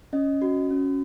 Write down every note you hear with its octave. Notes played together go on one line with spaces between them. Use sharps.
C#4 D#5
F#4
C#4